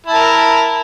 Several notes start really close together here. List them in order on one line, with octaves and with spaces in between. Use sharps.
E4 A5 A#4